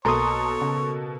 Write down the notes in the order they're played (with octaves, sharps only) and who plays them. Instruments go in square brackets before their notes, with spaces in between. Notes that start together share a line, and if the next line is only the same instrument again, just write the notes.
[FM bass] B1 [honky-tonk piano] B2 A#3 A4 [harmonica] C#5 [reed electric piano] A#5 C6 D#6
[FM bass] C#3